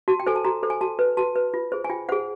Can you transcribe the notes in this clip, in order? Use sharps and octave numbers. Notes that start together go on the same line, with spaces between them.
F#4 A5
G5
A4 C5 G#5
A5
F#4 A#5
A4 C5
G#5
F#4 A5
B4
F#4 A5
B4
F4
G#4 C5
G#5
F4 G5
G#4 C5 F#5